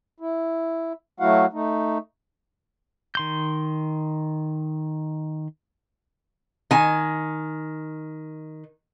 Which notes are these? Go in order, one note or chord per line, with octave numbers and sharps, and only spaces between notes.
E4
F#3 A3 E4 F#4 F5 F#5
A3 D#4
D#3 C6 G6
D#3 G#5